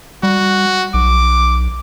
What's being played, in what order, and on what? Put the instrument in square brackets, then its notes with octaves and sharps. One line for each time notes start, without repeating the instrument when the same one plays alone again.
[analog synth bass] G3 [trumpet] F#4
[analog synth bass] B1 [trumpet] D6